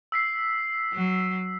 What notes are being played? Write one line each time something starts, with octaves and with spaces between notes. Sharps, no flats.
E6 B6 C7
F#3